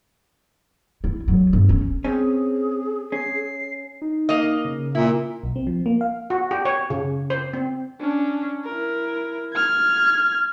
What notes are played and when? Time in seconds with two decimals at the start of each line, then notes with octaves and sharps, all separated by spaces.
1.04 E4
1.28 F#3
1.53 G1
1.69 C#4
2.04 C4 C#4 G#4
3.12 C#4 C7
4.02 D#4
4.29 A#3 D#5
4.65 C#3
4.95 A#2 E4
5.43 B1
5.56 C4
5.67 F3
5.86 A#3
6.01 F5
6.30 F#4
6.51 G4
6.65 C#5
6.90 C#3
7.30 C5
7.54 C4
8.00 C#4 D4
8.65 E4 A#4
9.54 F6 G#6